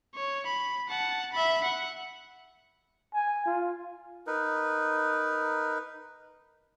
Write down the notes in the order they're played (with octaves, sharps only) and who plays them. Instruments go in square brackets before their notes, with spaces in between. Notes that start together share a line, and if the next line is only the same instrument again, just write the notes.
[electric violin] C#5
B5
F#5 A5
E5 B5
F#5
[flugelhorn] G#5
F4
[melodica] D#4 A#4 B4